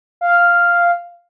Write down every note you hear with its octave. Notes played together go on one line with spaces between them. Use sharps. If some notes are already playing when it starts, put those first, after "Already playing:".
F5